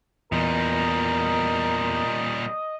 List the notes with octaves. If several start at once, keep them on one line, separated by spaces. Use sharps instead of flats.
E2 A#2 G3 A#4 D#5